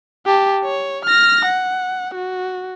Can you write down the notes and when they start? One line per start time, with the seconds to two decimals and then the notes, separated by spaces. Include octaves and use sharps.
0.26 G4 A5
0.64 C#5
1.05 F6 A#6
1.45 F#5
2.14 F#4